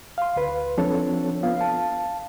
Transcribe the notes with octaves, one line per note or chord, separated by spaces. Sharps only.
F5 C6
D2 B4
F3 C4 D4 A4 C#5
B3 F4 F5
F5 A5